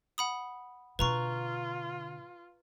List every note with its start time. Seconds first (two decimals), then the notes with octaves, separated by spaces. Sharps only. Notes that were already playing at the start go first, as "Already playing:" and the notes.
0.18 F#5 B5 D#6
0.99 B2 D3 F4 B4 A#5 C#6